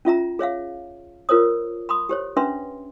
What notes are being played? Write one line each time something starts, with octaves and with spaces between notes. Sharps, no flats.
C#4 F4 E5 A#5
G#4 C#5 E5 F5
F4 A#4 C5 C#5 D#6
B5 C6 D#6
G4 C5 C#5
C#4 D4 B4 E5 C6